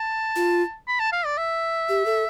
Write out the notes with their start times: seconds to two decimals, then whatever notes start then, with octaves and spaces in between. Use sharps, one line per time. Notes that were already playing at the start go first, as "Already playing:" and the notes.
Already playing: A5
0.36 F4
0.88 B5
1.00 A5
1.12 F5
1.25 D5
1.38 E5
1.89 G4
2.06 A4